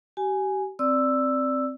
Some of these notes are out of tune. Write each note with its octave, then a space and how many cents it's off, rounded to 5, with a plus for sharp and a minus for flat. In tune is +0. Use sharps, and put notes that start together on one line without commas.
G4 -35 G#5 +0
C4 +0 D5 +0 E6 +0